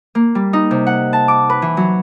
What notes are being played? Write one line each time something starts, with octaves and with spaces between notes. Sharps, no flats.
A#3
G3
D#4
C3
F#5
A5
D6
B4
E3
F#3